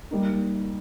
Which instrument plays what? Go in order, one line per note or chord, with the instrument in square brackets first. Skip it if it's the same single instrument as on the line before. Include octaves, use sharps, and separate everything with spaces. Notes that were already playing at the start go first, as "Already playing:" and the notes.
[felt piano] G3 A#3 D#4